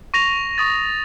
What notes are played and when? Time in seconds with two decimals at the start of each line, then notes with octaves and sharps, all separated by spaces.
0.14 C#6 A#6 F7
0.58 C#6 D#6 A6